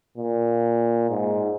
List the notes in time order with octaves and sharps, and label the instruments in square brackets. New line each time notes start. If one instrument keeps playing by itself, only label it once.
[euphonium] A#2
G#2